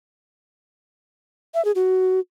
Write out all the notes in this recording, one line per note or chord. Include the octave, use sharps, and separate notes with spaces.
E5
G#4
F#4